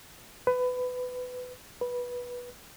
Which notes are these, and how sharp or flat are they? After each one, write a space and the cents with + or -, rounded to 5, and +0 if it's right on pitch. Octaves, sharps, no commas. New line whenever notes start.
B4 +20
B4 -15